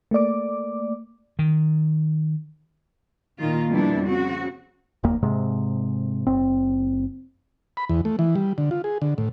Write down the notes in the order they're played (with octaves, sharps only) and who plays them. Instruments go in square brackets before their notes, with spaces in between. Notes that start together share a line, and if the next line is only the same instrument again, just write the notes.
[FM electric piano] A3 A#3 D5 D6
[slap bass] D#3
[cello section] A#2 D#3 F4
F2 B2 G3 D4 E4
C#3 C4 F#4
[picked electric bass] F1 D#2 A#3
G#2 C3 G#3
F#1 C4
[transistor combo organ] B5
E2
A3
E3
G3
D3
F4
G#4
D3
A2